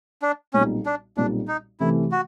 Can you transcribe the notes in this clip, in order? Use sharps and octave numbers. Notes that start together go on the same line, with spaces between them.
D4
B1 A#2 G3 C4 C#4 D#4
D4
B1 A#2 G3 C4 D4 D#4
D#4
C3 E3 A3 E4
F#4